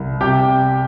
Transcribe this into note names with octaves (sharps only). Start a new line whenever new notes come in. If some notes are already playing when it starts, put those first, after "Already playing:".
Already playing: C2
C3 G4 G5